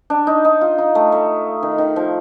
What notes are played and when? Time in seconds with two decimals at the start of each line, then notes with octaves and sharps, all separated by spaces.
0.10 D4
0.27 D#4
0.45 D#4
0.61 F4
0.78 D#4
0.95 A3
1.12 A3
1.63 D#3
1.78 D#3
1.96 F3